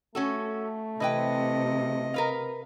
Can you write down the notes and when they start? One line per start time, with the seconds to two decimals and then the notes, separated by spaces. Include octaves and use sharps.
0.15 A3 C#4 F#4 A4
1.00 C3 E3 B4 D#5 G5
2.14 A#4 B4 F5